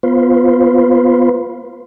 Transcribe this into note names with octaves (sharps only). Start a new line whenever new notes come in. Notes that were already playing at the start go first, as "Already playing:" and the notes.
B3 F4 B4 C5